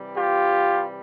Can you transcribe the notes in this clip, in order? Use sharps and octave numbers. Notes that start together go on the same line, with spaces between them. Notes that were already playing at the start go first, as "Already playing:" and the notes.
Already playing: C3 E3 G3
F4 G4